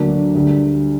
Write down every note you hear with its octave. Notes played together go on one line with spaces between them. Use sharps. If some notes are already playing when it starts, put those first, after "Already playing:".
Already playing: D2 D3 F#3 A#3 D4
D2 D3 G3